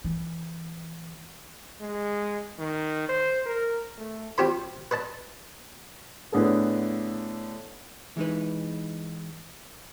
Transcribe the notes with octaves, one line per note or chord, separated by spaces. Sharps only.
E3
G#3
D#3
C5
A#4
A3
C4 F4 G4 C5 B5
B4 D#5 A5
A2 D3 B3 G#4 A4
E3 G#3 D#4 B4